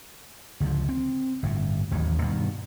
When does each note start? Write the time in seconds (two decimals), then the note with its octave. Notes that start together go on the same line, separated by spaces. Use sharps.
0.60 C#2 D3 F3
0.89 C4
1.43 G1 A2
1.91 A1 D#2 G#2 F#3
2.22 G2 B2 D#3